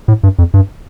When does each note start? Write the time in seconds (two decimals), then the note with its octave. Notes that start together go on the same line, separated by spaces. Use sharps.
0.08 A2
0.23 G2
0.39 F2
0.54 G2